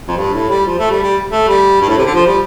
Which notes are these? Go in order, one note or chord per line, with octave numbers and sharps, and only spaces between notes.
F2
G2
A2
G3
F3
A3
G3
G3
A3
G3
G2
A2
C3
D3
F3
G3